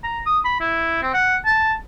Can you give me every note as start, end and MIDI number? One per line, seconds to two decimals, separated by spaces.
0.04 0.20 82
0.26 0.39 87
0.44 0.56 83
0.60 1.02 64
1.02 1.12 60
1.14 1.36 78
1.45 1.74 81